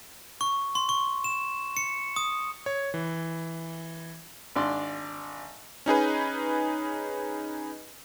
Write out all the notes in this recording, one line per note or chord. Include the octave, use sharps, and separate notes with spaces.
C#6
C6
C#6
E7
C#7
D#6
C#5
E3
G#1 D4 D5 C6
C#4 D#4 G#4 B4